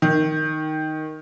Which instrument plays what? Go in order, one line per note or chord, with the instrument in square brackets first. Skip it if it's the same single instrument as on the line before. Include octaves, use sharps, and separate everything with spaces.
[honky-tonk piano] D#3